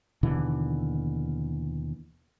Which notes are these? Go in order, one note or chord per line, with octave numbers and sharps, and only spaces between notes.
D#2 B2 D3 E3